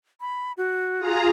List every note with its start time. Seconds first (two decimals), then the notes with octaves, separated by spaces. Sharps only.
0.21 B5
0.57 F#4
0.98 F4 G#4 A#5